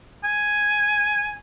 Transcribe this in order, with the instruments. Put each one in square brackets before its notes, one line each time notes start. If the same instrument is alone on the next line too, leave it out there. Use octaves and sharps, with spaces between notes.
[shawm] G#5